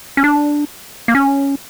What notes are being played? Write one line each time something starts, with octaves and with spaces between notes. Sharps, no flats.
C#4
D4
A#3
C#4